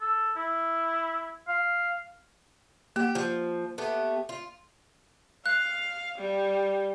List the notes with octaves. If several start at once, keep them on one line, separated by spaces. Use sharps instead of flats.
A4
E4
F5
A#3 G4 F#5
F3
A3 B3 G4
F4
F5 F#6
G3